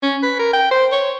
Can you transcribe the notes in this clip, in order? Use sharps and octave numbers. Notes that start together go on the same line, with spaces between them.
C#4
B4
A#4
G5
C5
C#5